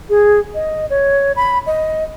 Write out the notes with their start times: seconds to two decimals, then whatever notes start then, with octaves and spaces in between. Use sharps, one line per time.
0.09 G#4
0.55 D#5
0.90 C#5
1.36 B5
1.67 D#5